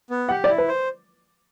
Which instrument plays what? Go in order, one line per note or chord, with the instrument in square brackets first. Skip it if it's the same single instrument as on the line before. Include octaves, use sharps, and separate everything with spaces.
[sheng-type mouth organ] B3
[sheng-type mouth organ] G4 [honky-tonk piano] F#5
[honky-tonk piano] D5
[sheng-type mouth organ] E4
[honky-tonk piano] B4
[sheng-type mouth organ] C5